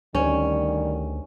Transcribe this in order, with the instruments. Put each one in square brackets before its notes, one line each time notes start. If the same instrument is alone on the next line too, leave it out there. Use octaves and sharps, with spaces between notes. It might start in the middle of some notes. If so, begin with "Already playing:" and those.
[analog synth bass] D2 [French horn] D#3 [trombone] G3 [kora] C#4